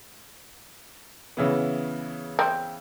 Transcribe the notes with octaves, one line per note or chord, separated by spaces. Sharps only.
C#3 E3 B3
C4